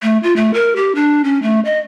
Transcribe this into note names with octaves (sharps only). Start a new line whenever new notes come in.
A3
F4
A3
A#4
G4
D4
C#4
A3
D#5